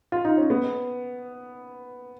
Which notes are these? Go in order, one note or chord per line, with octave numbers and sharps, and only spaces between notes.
F4
D#4
C#4
B3